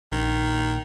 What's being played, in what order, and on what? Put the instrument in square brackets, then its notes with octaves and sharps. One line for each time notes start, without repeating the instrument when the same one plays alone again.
[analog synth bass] A#1 [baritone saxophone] D#3